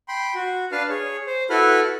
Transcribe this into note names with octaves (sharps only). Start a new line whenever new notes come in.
G5 B5 C6
F#4
D4 B4 F5 A5 F6
G#4 C#5
C5
E4 F#4 A4 B4 B5 F6